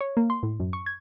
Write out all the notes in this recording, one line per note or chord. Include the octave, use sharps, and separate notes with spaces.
C#5
A#3
C6
A2
F#2
C#6
G#6